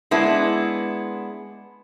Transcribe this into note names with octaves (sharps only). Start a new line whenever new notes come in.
G#3 B3 D4 E4